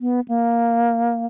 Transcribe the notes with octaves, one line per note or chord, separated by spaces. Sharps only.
B3
A#3